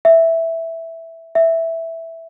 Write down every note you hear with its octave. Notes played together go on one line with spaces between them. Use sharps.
E5
E5